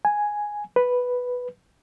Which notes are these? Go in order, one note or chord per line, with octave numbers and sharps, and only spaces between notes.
G#5
B4